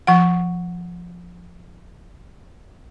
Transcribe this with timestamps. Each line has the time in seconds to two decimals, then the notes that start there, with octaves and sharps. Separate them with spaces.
0.07 F3 F#5